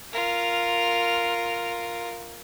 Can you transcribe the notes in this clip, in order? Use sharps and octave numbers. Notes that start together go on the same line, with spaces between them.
F4 A#4